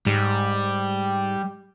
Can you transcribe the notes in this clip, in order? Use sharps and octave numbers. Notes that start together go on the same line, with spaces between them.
G#2 G3